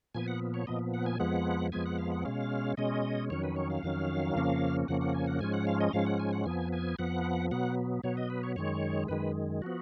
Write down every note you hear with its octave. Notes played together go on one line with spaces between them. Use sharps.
A#2 F3 B3 G#5
F#5
C#5
A#2 F3 B3 D#5
F#5
G#5
F2 F3 G#3 B3 F#5
F2 F3 G#3 B3 G#5
F#5
F5
F#5
B2 G#3 C#4 F5
B2 G#3 C#4 D#5
F2 D#3 F#3 C#4 C#5
B4
C#5
F5
F2 D#3 F#3 C#4
F2 C#3 F3 A#3 C#4
F2 C#3 F3 A#3 C#4 F#5
F#5
G#5
F#5
G#2 F3 G#3 C#4 G#5
F#5
F5
D#5
G#2 F3 G#3 C#4 F5
F#5
G#5
F#5
F2 F3 B3 G#5
G#5
F2 F3 B3 F#5
B2 F#3 B3 F#5
B2 F#3 B3 C#5
D#5
B4
C#5
F#2 D#3 G#3 C#5
F#2 D#3 G#3 B4
F3 B3 F#4